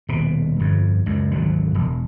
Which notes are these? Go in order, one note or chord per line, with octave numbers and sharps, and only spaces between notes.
D#1 B2
G1 F2
C#2 F#2
G#1 D2 F#3
E1